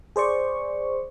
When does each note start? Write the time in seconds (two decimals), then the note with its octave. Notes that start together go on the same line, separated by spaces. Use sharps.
0.16 G#4 C5 D5 C#6